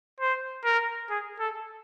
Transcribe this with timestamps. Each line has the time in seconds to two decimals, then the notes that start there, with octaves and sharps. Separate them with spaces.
0.20 C5
0.65 A#4
1.10 G#4
1.40 A4